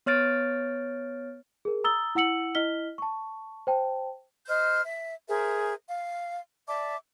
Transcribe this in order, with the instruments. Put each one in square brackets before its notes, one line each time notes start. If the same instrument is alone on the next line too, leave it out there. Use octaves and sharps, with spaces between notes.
[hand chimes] B3 C#5 F6 A6 D7
[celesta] G#4 A#4
A#5 D#6 E6 A6 G7
E4 F#5 E6 C#7 F#7
E4 D#5 F6 B6 G7
A5 C#6
C5 G5 A5
[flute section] C5 D#5 F6 G6
E5
G#4 A#4 C5 E5
F5
D5 E5 A5 D6